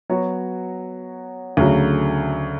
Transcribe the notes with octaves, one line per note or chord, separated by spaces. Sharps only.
F#3 B3 F#4 C#5
D2 C#3 F#3